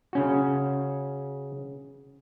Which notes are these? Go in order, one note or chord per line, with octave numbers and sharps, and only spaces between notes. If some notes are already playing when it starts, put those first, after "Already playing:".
C#3 C#4 F#4